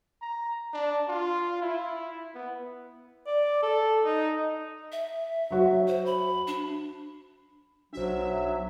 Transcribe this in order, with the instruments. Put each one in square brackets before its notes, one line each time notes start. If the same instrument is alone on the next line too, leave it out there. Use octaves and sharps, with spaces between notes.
[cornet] A#5
D4
F4
E4
B3
[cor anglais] D5
A4
D#4
[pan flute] E5
[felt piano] F#3 F#4 C#5
[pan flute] C5
B5
D4
[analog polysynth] B1 E5 [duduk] F#3 [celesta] D4 F#4 C5